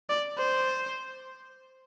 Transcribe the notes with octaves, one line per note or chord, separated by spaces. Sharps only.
D5
C5